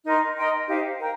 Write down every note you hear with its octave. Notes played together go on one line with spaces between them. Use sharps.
D#4 A#4 D#5 C6
A#4 D#5 G5 C6
D#4 G4 C5 F5
A#4 G5